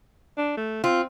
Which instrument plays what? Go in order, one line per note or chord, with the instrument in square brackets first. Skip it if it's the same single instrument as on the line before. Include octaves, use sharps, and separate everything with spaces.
[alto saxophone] D4
A3
[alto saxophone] C4 [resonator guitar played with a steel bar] F4